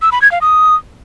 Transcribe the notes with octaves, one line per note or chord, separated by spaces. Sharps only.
E6
B5
G#6
F5
D#6